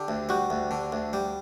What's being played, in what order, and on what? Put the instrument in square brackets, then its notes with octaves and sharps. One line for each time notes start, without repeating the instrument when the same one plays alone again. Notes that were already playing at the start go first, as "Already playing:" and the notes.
Already playing: [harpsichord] D3 [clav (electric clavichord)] G4
[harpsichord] D2
[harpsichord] G3 [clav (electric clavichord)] F#4
[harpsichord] D2
D3
D2
G3